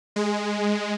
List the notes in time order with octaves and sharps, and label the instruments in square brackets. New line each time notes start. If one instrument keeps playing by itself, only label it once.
[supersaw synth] G#3